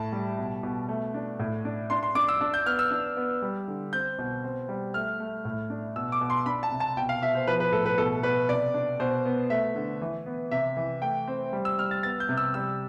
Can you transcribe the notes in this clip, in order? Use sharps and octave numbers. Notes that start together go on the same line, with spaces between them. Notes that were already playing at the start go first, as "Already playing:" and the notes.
Already playing: A2 A5
G3
B2
B2
A3
D4
A2
D4
D4 C6
C6
D4 D6
E6
D4
G6
B3 F6
E6
D4
B3
G3
D3
C4 G6
B2
C4
G3
A3 F6
A3
A2
D4
B2 E6
D6
B2
C6
D4 B5
A5
C3
A5
B2 G5
F5
B2 E5
C5
F3 B4
B4
A2 A4
B4
B2 A4
B2 B4
C3 D5
D4
B2 C5
B3
A3 E5
D3
E3
B3
C3 E5
E3
A3 G5
C4
G3
E6
G3 F6
A6
B3 A6
G6
C3
E6
G3 E6